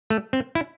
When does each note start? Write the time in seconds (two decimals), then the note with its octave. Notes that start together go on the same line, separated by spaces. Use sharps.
0.10 A3
0.33 C4
0.55 E4